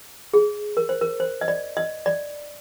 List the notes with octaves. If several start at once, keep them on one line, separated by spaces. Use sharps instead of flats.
G#4
A#4
C5
A#4
C5
D#5
D5
D#5
D5